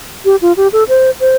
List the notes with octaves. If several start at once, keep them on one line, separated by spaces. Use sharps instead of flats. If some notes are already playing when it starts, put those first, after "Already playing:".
G4
F4
G4
A4
C5
C5